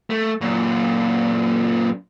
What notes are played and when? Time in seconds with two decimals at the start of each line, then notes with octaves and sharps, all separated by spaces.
0.10 A3
0.41 F#2 A#2